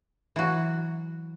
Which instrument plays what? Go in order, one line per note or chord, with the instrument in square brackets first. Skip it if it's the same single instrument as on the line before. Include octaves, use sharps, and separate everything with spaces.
[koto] E3 F#3 F#4